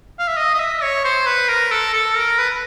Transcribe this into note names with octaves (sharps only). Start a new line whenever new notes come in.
F5
E5
D#5
D#5
E5
C#5
C5
B4
A#4
A4
A4
A#4
B4